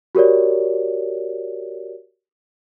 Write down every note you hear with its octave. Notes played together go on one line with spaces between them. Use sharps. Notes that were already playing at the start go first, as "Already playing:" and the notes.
F#4 G4 A#4 C#5 D5